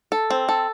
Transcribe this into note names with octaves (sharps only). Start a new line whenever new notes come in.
A4
C4
A4